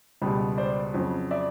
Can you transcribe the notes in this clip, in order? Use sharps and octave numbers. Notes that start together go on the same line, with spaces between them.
C#2 B2 G3
C5 D5
F2 C#3 F#3
D5 E5